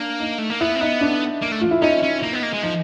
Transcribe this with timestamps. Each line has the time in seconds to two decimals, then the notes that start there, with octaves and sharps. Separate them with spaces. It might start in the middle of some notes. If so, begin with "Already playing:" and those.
Already playing: A#3 D4
0.20 D#4
0.39 A3
0.50 A#3
0.60 B3 E4
0.76 C4
0.81 B3 D#4
1.01 D4
1.42 A#3
1.52 A3
1.61 F4
1.71 E4
1.82 C#4 D#4
2.03 C#4
2.22 A#3
2.33 B3
2.43 A#3
2.53 G#3
2.63 F3 D#4